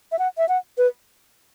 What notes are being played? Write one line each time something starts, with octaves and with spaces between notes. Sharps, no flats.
E5
F#5
E5
F#5
B4